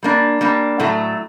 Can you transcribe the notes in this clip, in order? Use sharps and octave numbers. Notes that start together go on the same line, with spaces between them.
G3 A#3 D4
G3 A#3 D4
A2 F#3 A3